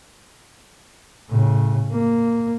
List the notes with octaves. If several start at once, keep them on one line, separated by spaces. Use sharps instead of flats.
A2 C#3
A#3